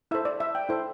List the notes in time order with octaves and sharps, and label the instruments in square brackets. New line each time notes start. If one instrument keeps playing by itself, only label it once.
[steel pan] E4 A4 C5 E5
D5
E5
G5
E4 A4 C5